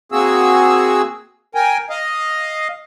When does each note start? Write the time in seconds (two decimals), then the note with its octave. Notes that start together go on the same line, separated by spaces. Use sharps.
0.12 A#3 C4 F#4 G#4 E6
1.55 A#4 G5 G#5
1.90 D#5 F5